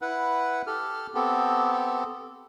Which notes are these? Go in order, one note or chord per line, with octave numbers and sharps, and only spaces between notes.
E4 B4 F#5
G4 A4 F6
B3 C4 G4 A4